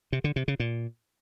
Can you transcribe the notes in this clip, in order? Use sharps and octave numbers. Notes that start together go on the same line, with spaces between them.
C3
D3
C3
C#3
A#2